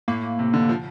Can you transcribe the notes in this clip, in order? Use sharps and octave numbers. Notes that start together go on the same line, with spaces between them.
A2 A#3
C3
D3
F3